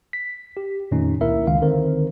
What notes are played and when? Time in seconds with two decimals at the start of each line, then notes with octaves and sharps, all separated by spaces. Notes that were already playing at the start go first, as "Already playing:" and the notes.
0.13 B6
0.57 G4
0.91 F2 A#2 D#3 A3 C#4 D#4
1.21 C#2 A#3 E4 A#4 E5
1.47 C#2 D#3 F5
1.61 D3 D#3 C4 A#4 C5